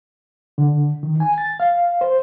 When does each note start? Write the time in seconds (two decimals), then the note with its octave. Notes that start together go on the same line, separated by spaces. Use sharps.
0.58 D3
1.03 D#3
1.20 G#5
1.38 A6
1.60 F5
2.01 C5